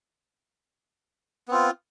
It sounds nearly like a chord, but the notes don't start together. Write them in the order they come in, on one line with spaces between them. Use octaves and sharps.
B3 C4 F4